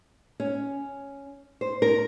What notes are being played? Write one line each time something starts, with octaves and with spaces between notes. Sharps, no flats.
C#4
C5
A#4